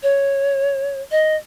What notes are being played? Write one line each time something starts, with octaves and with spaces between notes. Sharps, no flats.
C#5
D#5